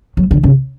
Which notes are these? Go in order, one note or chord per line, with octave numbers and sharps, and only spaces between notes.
F#3
D3
C#3